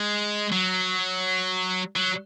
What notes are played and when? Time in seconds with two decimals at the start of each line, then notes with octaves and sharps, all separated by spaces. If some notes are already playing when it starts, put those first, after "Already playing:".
Already playing: G#3
0.52 F#3
1.96 F#3